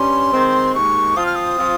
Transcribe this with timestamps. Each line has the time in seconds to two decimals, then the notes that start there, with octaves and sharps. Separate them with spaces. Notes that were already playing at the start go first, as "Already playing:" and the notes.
Already playing: G2 G3 C#4 C6
0.33 D#3 G#3 C4
0.75 D#2 D#3 G#3 C#6
1.16 F3 C4 F4 D#6
1.26 F6
1.35 D#6
1.58 F3 C4 F4